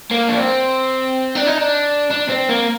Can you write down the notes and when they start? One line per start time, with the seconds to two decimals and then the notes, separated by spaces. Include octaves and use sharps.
0.11 A#3
0.28 D4
0.37 C4
1.36 D4
1.47 D#4
1.58 D4
2.11 D4
2.30 C4
2.49 A#3